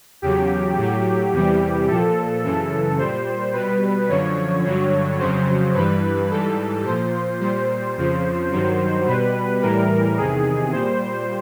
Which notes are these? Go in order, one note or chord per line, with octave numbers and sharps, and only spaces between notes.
E2 C#3 F#3 G4
A2 F#3
E2 C3 E3 G3
A#2 F3 A4
F#2 C#3 E3 A4
A#2 G3 C5
B2 G3 B4
F#2 D3 F3 C#5
G2 D3 F#3
F2 C#3 F#3 C5
G2 E3 G3 B4
G#2 E3 G3 A4
A#2 F3 C5
A#2 G3 C5
F2 C#3 F3
G2 D#3 F#3
B2 G3 B4
A2 E3 G3 A#4
E2 C3 D#3 G#4
A#2 G3 C5